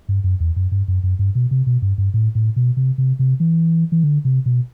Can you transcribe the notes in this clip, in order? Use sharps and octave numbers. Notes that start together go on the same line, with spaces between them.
G2
F#2
E2
F#2
G2
F#2
F#2
G2
B2
C3
B2
G2
G2
A2
A2
B2
C3
C3
C3
E3
E3
D3
C3
B2